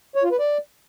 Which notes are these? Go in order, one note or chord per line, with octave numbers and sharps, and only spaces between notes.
C#5
F4
B4
D5